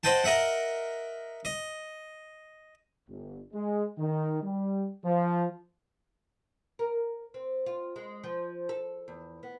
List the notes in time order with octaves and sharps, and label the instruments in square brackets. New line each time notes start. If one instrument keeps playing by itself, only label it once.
[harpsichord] C5 D#5 F#5 G5 A5
A#4 D#5 E5 F#5
D#5
[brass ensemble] G1
G#3
D#3
G3
F3
[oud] A#4
C4
F4
G#3
F3
A4
E2
B3